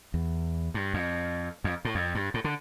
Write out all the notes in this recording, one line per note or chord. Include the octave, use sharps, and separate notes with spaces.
E2
G2
F2
F2
A2
F2
G2
A2
D3